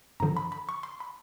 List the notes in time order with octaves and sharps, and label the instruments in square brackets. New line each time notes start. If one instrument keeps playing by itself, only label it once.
[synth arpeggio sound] G2 D3 F3 A#5
B5
B5
C#6
C6
B5